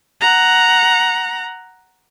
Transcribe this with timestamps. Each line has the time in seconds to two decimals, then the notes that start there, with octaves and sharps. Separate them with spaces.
0.21 F#5 A#5